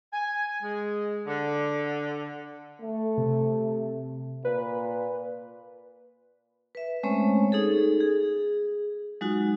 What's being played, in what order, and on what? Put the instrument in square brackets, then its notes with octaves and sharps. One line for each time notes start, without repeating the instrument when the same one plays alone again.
[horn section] G#5
G#3
D3
[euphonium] A3
[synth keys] C3
[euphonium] A#2 [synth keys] B4
[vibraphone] B4 E5
G#3 A3 C4 C#4 C5 C#5
D#4 G#4 A4
G#4
F#3 G#3 D#4 F4 F#4